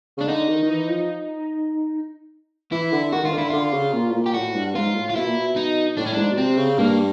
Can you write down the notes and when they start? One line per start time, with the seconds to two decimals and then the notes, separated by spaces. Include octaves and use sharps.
0.17 C#3 D4
0.28 D3 D#4
0.49 D#3
0.63 D#3
0.69 E3
0.89 F3
2.72 E3 E4
2.92 D3
3.13 D#3 F#4
3.23 D#3 F4
3.33 D3
3.38 E4
3.50 D3 F4
3.74 C#3
3.93 A#2
4.10 A2
4.14 A#2
4.26 G4
4.34 A2 F#4
4.55 G2
4.75 G#2 F4
4.95 A2
5.10 F4
5.15 B2 E4
5.26 A#2
5.37 B2
5.56 D#4
5.97 A2 D4
6.06 C#4
6.14 G#2 D4
6.32 B2
6.37 C3 C4
6.58 C#3
6.78 G2 A#3